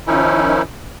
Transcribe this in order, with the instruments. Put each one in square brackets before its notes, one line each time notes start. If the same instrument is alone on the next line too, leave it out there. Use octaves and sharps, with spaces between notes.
[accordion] D#3 F3 C#4 D#4 E4